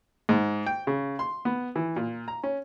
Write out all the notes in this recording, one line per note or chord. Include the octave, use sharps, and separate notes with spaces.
G#2
G5
C#3
C6
B3
E3
A#2
A#5
C#4